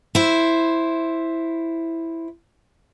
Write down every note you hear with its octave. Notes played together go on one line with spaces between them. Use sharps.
E4 C5